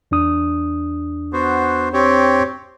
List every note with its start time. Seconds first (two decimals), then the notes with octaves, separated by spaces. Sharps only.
0.11 E2 D4 D#6
1.33 B3 F#4 C5
1.93 C4 G4 C#5